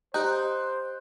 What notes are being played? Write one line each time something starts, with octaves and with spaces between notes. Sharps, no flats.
D#4 G4 C5 F#6 G6